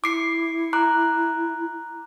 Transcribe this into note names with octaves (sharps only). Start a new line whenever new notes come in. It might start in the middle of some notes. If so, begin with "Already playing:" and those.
E4 D6 C7 C#7
A#5 D6 F#6